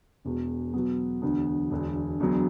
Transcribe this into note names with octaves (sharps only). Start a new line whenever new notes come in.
E1 E2 B2
B2 F#3 B3
E1 D2 D3 B3
E1 D2 D3
E1 D2 D3 F#3 B3